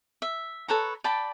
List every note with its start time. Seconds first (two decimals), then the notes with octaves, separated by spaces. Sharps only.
0.22 E5
0.68 A4 B4 C#5 A#5
1.04 D5 G5 A5 B5